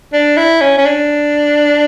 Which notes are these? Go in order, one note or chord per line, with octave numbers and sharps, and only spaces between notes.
D4
E4
C#4
C#4
D4